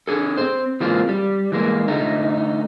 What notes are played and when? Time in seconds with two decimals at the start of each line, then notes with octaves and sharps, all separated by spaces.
0.08 D4 G#4 A4
0.37 C4 C5
0.80 E3 G#3 A#3 C4 F4
1.09 G3
1.52 E3 G#3 A#3
1.88 D3 A3 D#4